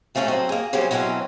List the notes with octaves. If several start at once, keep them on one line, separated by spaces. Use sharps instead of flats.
A#2 A3 A#3 C#4 A4
F#3 C4 A4 D#5
A#3 G#4
C#3 F#3 G3 C4 C#4 G4
B2 E3 F#3 C4 C#4